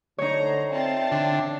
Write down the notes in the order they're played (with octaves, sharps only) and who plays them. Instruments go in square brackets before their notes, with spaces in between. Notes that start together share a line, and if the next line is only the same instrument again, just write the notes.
[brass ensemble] D3 [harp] D#4 C#5 [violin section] C5 A#5
[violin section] C4 F4 A5 [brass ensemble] D5 E5 G5
[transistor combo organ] D3